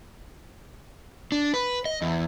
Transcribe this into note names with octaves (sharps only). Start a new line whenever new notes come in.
D4
B4
D#5
E2